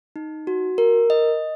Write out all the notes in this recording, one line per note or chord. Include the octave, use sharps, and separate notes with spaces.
D#4
F#4
A#4
D#5